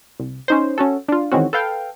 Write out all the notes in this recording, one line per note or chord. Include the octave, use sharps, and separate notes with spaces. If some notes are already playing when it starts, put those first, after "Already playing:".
C2
C#4 D#4 C5
C#4 F#4 A4
D4 F4
D#3 E3 G#3 C4 C#4 F#4
A4 B4 F5 G5